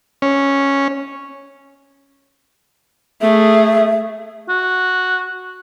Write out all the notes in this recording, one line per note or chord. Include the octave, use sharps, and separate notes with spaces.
C#4
A3 G#4 E5
F#4